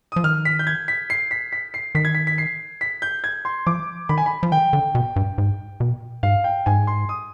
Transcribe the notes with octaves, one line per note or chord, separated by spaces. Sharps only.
F3 D#6
D#3 F6
B6
G6
G#6
B6
C7
B6
B6
C7
D#3 B6
G#6
B6
B6
C7
B6
G6
G#6
C6
F3 D6
D#3 B5
G#5
B5
F3
D#3 G5
D3
B2
G2
G#2
B2
G#2 F5
G5
G#2 G#5
C6
D#6